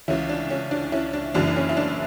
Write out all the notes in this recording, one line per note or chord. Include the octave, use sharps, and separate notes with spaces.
C#2 C#3 E3 C#4 E4
D4
C#4
D4
C#4 E4
D4
F#1 F#2 C#3 E3 D4
D4
C#4
E4
D4